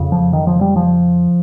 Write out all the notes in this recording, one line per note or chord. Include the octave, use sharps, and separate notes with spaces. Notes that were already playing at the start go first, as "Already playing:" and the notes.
Already playing: F2 C#3
F3
D#3
F3
G3
F3